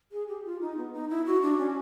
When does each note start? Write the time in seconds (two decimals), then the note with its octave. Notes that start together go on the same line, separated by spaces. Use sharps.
0.12 G#4
0.28 G4
0.45 F4
0.61 D#4
0.78 B3
0.93 D#4
1.10 E4
1.26 F#4
1.42 D4
1.58 C#4